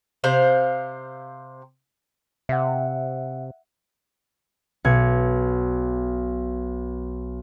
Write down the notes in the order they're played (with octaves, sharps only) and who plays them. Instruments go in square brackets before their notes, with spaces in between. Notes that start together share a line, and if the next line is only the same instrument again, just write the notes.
[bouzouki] C3 C5 F5
[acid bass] C3 [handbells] E5 F#5
[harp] B1 G#6 C#7